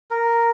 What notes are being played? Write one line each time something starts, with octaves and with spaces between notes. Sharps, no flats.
A#4